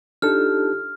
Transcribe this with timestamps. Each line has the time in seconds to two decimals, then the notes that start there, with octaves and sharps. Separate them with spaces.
0.22 D4 D#4 F4 G4 A4 A5 F6